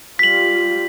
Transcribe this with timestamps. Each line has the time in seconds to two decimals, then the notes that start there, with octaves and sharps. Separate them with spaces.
0.19 G3 F4 B6 F#7